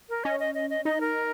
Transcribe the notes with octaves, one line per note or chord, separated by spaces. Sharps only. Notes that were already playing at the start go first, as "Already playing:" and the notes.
A#4
C#4 D#5
D#5
D#5
D#5
D#4 D#5
A#4